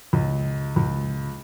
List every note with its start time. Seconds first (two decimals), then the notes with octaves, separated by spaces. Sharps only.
0.13 C#2
0.76 C#2